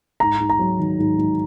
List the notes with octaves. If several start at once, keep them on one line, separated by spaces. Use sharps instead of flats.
G#2 A#5
G#2
A#5
F#3
D#3
G#2
G#2